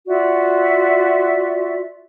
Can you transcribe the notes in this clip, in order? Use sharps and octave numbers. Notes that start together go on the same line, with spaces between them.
F4 F#4 D5 E5